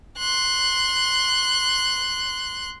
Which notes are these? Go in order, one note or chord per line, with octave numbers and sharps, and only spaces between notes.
C6 F#6